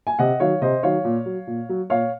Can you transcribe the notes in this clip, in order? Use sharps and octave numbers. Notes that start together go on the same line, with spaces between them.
G#5
C3 D#5 F#5
D#3 F#3 C#5 F5
C3 C5 D#5
D#3 F#3 C#5 F5
A#2
F#3
A#2
F#3
A#2 C#5 F5